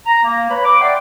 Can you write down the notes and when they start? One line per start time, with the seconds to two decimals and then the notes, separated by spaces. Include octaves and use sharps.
0.06 A#5
0.24 A#3
0.50 B4 C#5 A#5 B5
0.65 D6
0.81 D5 E5 F#5 G5 C6 D6